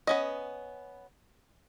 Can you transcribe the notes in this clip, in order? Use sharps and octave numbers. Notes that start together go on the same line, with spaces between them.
B3 C#4 D#5